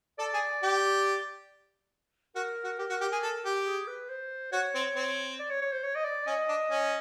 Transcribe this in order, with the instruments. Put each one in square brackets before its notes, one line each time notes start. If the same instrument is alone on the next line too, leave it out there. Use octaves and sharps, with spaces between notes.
[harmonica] A4 [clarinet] D5
[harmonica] G#4
G4
[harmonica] F#4 [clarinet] A#4
[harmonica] F#4
[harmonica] G4 [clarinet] A#4
[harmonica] F#4
G4
G#4
A4
G4
[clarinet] G#4
B4
C5
[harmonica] F#4 [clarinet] C#5
[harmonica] C4
C4
[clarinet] D5
C#5
C#5
C5
C#5
D#5
D5
[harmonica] C#4 [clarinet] D#5
[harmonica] D4
C#4